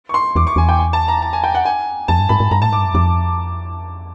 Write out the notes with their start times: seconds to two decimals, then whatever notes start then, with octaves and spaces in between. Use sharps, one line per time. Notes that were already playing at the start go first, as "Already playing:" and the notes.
0.09 C#6
0.14 C6
0.36 E2 D6
0.47 C#6
0.56 E2 G#5
0.69 G5
0.79 G#5
0.93 A5
1.08 A#5
1.22 A5
1.33 G#5
1.44 G5
1.55 F#5
1.65 G#5
2.08 F2 A5
2.19 G2
2.29 G#2 B5
2.40 G#2
2.51 G2 A#5
2.62 A2 A5
2.70 G#2 D6
2.78 G2
2.86 F#2
2.94 F2 D6